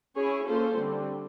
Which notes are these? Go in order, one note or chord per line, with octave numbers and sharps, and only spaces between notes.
C#4 E4 G#4 C#5
A#3 C#4 F4 A4 C5
D3 G3 C4